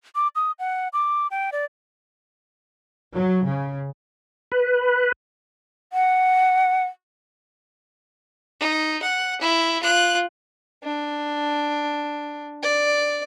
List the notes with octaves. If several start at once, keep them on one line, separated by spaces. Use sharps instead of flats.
D6
D#6
F#5
D6
G5
D5
F#3
C#3
B4
F#5
D#4
F#5
E4
F4 F#6
D4
D5